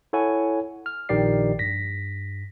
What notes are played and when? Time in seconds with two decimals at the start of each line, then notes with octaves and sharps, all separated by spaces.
0.13 E4 A4 C#5 F#5 G#5
0.86 F6
1.09 A#1 D#3 G4 D5 C7
1.59 G2 A#6 B6